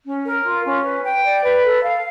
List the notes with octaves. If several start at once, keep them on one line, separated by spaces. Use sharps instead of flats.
C#4
A#4
F4
C#4
B4
G5
D5
B4
A4
F5